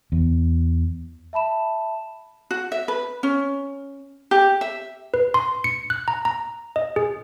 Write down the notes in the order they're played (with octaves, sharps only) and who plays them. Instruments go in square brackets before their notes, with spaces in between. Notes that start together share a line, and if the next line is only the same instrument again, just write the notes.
[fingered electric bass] E2
[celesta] E5 A5 B5 E7
[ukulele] F#4
E5
B4
C#4
G4
E5
[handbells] B4
C6
C#7
F#6
A#5
A#5
D#5
G#4